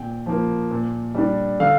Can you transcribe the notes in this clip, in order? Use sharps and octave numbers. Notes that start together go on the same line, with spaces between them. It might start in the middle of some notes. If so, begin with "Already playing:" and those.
Already playing: A#2 G5
F3 A#3
A#2
G3 D4
D3 F5